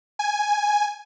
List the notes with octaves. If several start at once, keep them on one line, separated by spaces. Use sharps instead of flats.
G#5